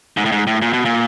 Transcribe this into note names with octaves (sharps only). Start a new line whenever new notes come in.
G#2
A2
G#2
A2
A#2
B2
A#2